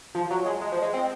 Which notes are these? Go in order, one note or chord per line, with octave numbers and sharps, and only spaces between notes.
F3
F#3
G#3
G#3
F3
G#3
C4